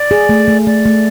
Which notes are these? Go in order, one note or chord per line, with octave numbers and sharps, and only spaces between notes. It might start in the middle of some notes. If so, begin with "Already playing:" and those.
Already playing: D5
G#4
A3
A3
A3 D5
A3